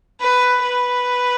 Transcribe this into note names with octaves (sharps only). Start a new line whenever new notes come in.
B4
B4